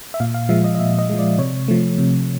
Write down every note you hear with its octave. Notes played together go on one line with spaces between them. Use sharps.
E5
A#2 F5
F5
F3 G#3 E5
D#5
D#5
A#2 E5
D#5
F3 G#3
D5
C3 C#5
F3 A3
C3